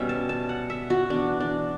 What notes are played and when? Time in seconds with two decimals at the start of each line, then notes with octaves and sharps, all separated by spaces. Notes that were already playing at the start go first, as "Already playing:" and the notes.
Already playing: B2 G3 C#4 E5
0.09 A5
0.29 A5
0.49 F#5
0.70 E5
0.90 F#4
1.10 E3 B3 D4
1.40 D4